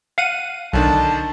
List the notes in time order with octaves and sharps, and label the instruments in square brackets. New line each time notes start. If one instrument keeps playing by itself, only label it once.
[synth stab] F5 F#5 D#7
[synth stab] B1 [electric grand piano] D3 D#3 D4 [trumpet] A5